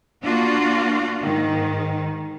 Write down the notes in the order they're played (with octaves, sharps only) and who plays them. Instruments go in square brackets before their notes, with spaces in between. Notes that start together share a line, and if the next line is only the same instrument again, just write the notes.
[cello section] A#3 D4 F4 F#4
G#2 D#3